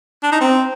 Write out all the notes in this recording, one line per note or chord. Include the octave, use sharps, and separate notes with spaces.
D4
D#4
C4